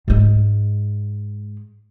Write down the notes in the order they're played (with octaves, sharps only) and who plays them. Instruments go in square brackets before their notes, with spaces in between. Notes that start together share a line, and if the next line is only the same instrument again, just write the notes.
[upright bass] G#2 G#3